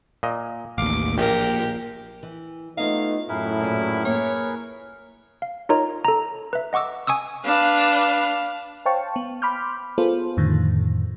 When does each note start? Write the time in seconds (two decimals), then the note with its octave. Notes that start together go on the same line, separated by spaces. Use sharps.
0.23 A#2 D#5
0.78 A1 D#2 F5 D6
1.18 A#1 A#2 G4 A#4
2.23 E3
2.77 A3 B3 D#4 F4 C#5 D#5 F5
3.29 F#2 A2 E4 G#4 A#4 B4
3.61 A#2 F4
4.05 A#3 C#5
5.42 F5
5.69 D#4 F4 A#4 C#5 D#5 A#5
6.05 A4 A#5
6.53 B4 E5
6.73 D#5 F#5 C#6 D6 E6
7.07 G#5 C#6 D#6 E6
7.45 D4 B4 F5
8.86 C5 C#5 F5 G5 A5 C#6
9.16 B3
9.42 B5 C6 D6 F6 G6
9.98 B3 F4 G#4 A4 C5
10.37 F2 A2 D3 D#3